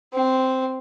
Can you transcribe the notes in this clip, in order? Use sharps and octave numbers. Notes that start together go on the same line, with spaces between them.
C4